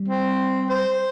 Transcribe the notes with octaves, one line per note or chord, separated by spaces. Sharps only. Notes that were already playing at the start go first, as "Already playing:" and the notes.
Already playing: G3
C4
C5